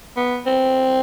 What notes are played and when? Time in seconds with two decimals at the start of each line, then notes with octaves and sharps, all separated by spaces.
0.16 B3
0.46 C4